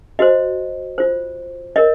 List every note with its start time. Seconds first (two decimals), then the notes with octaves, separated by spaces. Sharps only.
0.19 F#4 C5 D#5
0.98 F4 C5
1.76 A#4 C#5 D#5